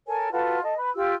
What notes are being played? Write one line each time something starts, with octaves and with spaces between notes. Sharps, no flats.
A4 A#4 C#5 G#5
F4 F#4 A4 B4
A4 D#5
B4
F4 G4 E6